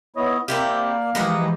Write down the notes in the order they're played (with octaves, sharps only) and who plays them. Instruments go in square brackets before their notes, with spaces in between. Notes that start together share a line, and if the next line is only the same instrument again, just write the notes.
[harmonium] B3 E4 C#5 [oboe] D#5
[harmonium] A#3 D5 [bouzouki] C4 E4 G4 [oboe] F5
[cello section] E3 F3 G#3 [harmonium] G4 D#5 [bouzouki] A#4 B4 F#5